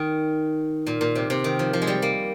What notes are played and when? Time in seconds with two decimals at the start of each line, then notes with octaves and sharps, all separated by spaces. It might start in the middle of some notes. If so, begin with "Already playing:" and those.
Already playing: D#3
0.87 A#2
1.01 A#2
1.15 C3
1.30 C3
1.44 D#3
1.59 F3
1.73 F3
1.82 G#3
1.87 G3
2.02 A#3